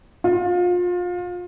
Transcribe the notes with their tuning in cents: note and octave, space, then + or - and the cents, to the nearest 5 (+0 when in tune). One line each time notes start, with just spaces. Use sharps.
F4 +30